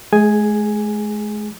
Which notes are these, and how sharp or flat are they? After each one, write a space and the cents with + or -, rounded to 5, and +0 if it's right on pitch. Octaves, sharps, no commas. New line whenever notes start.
G#3 +40 G#4 +0 G#5 +0